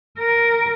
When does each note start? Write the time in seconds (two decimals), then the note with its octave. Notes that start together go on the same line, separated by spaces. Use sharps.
0.19 A#4